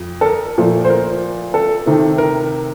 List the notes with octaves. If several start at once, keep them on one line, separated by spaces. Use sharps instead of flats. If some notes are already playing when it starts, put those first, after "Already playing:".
Already playing: F2
A4
A#4
A#2 F3 A3
C5
A#4
A4
C3 D#3 A3
A#4